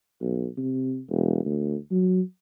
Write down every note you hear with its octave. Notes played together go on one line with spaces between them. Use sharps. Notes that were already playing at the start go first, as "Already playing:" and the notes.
B1
C3
E1
D2
F#3